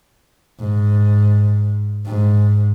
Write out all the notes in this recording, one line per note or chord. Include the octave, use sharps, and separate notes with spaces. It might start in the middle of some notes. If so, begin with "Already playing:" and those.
G#2
G#2